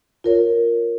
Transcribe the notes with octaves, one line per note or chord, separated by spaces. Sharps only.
F4 A#4 C#5